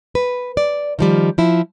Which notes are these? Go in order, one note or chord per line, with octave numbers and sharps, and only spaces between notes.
B4
D5
D#3 F3 G3
F3 E4